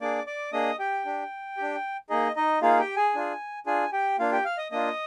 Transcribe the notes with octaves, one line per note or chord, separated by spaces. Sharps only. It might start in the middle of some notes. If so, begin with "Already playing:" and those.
A#3 D4 G#4 D5 D6
D5 D6
A#3 D4 G#4 D#5 D#6
G4 G5
D4 G4
D4 G4
A#3 D#4 G#4 D#5
D#4 D#5
A#3 D#4 F4 G#4 F5
G4 G5
G#4 G#5
D4 F4 G#4
D4 F4 G#4 G#5
G4 G5
A#3 D4 F4 F5
G4 G5
F5 F6
D#5 D#6
A#3 D4 F4 D#5 D#6